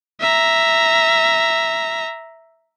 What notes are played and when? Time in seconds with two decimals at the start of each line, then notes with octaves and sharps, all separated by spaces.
0.20 E5 A#5